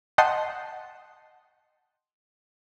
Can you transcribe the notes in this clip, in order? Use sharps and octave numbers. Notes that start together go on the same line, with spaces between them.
D#5 F#5 G5 A5 C6 D#6